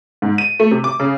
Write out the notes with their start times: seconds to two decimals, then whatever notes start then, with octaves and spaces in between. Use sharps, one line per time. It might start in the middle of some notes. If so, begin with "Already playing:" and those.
0.22 G#2
0.38 D#7
0.60 A3
0.71 C3
0.84 D6
1.00 C#3